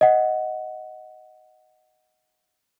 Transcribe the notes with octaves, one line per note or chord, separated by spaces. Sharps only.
D#5 F#5